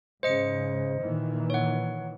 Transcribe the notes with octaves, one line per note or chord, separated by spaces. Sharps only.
G#2 C#3 C5 D#5 C#7
A#2 D#3 E3
C#5 F#5